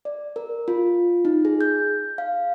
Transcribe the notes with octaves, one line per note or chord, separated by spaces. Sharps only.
D5
A#4
F4
D#4
G#4
G6
F5